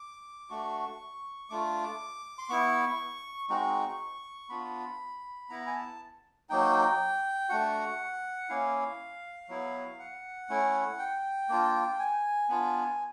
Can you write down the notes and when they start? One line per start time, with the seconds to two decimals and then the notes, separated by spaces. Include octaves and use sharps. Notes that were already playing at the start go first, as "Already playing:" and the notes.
Already playing: D6
0.50 A3 D4 F#4 C#6
1.50 A3 D4 F4 D6
2.38 C6
2.49 B3 E4 C#6
3.50 G#3 C4 D#4 F#4 C#6
4.50 B3 D4 F4 B5
5.49 B3 E4 A#5
5.67 G#5
5.75 A5
6.50 F#3 A#3 D#4 G5
7.49 A3 D4 F#4 F#5
8.49 A#3 C#4 E4 F5
9.49 F#3 B3 E4
9.99 F#5
10.49 A3 C#4 E4
10.99 G5
11.49 A#3 D4 F4
11.99 G#5
12.49 B3 D4 F4